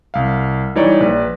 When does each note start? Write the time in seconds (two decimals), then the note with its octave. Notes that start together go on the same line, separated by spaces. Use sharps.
0.14 C2 F5
0.76 E3 G3 D#4 C#5 D5
1.00 A#1 B4 D5